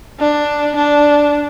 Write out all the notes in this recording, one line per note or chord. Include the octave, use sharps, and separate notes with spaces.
D4
D4